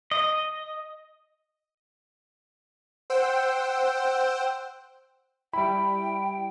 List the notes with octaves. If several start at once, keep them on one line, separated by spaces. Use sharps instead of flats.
D#5
C5 F#5 G5 E6
G3 E4 G5 B5